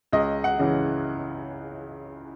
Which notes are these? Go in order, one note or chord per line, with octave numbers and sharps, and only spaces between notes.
C#2 D#5
F#5
C#3 E3